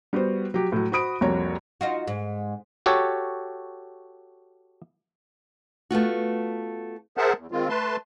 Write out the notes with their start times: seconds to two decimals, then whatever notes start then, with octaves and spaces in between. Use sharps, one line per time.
0.13 G3 B3 F#4 C5
0.54 F#3 G4
0.72 A2 F#3
0.92 F#4 C5 B5 D#6 D7
1.21 C2 F2 A#3 F#4 C#5 A#5
1.81 D#4 F4 F#4
2.08 G#2
2.86 F#4 G4 A4 C#5
5.91 A3 B3 F4 F#4
7.17 G#4 A#4 C5 E5 F#5 A5
7.37 E2
7.52 D#3 G#3 C4 F4
7.69 A3 B4 A5 C6